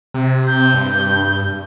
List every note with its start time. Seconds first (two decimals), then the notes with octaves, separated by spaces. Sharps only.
0.14 C3
0.47 G6
0.74 G2